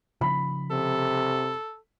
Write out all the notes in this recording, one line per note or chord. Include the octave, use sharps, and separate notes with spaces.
C#3 F3 B5
C3 A4